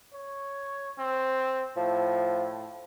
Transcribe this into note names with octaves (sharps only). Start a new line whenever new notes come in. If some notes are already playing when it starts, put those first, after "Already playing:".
C#5
C4
A2 F3